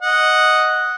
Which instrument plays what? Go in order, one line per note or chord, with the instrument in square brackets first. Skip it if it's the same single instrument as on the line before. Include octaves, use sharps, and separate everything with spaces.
[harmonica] D#5 F#5